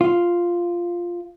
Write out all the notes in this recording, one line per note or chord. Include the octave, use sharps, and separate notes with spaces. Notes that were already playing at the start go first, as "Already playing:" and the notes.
F4